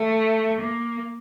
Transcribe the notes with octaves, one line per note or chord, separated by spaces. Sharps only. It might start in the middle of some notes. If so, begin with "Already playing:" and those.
Already playing: A3
A#3